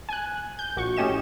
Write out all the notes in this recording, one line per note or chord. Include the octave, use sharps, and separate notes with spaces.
G#5 F#6
G6
A#1 F#4 C#6
A2 C#4 G4 D#5 E7